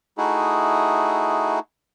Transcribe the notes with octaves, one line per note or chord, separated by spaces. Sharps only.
A3 D#4 E4 F#4 G#4